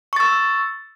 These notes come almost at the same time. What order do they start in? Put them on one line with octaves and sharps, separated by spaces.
C#6 A6 E6